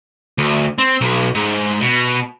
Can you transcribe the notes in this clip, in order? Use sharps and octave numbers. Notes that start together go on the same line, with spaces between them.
D2
C4
B1
G#2
B2